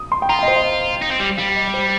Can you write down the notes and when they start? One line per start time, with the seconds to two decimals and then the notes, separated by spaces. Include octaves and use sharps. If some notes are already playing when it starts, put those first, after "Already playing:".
Already playing: D#6
0.12 C6
0.22 G5
0.29 F4 A#5
0.39 G5
0.43 D#5
0.48 C5
0.56 D#5
1.02 D#4
1.11 C4
1.20 G3
1.37 G3 F5
1.56 D#5
1.74 C5